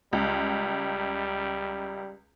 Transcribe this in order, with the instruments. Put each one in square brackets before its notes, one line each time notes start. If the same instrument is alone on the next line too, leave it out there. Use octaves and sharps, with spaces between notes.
[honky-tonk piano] C#2 [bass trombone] G3